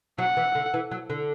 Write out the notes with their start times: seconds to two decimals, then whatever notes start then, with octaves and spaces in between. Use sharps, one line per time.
0.18 F#3 F#5
0.37 E3
0.55 D3
0.74 E3
0.91 F#3
1.10 D3